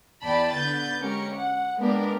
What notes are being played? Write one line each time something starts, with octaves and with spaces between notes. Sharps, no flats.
E2 D5 G5 A5 B5
D3 B3 B4 G6 A6
G#3 C#4 G4 A#4 C#7
F#5
G#3 A#3 B3 D4 G4 A#4